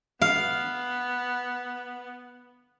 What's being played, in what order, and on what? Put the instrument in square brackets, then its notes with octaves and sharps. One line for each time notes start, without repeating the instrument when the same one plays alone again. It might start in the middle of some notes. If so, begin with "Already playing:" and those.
[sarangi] B3 [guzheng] F5